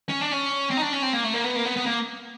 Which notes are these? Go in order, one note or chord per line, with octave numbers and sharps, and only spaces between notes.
C#4
D4
C#4
C4
D#4
D4
C#4
C4
A#3
A3
A#3
B3
A#3
B3
B3
A#3